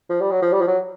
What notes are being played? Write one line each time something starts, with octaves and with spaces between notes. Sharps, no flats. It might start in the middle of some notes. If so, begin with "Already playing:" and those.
F3
G3
F#3
F3
G3
F3
F#3